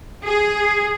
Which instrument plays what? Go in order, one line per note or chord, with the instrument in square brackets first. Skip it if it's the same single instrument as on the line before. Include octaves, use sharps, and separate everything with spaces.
[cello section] G#4